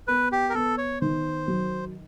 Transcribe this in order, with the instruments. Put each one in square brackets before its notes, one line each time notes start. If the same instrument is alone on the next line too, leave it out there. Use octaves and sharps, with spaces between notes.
[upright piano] B3 [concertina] B4
[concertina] G4
A#4
[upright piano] B3 [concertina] A4
[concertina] C#5
[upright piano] D#3 [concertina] C5
[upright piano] F#3